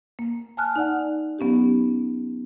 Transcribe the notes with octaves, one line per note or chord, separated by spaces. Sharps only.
A#3
G#5 A5 F6 F#6
D#4 D5 F#5
F#3 B3 C#4 D#4 G4